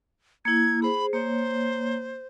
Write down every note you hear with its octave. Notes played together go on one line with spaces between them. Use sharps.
A#3 E4 G#6
G#4 C5 B5
A#3 C5 C#5